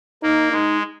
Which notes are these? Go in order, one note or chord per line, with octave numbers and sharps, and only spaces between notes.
A#3 D#4
G#3 D#4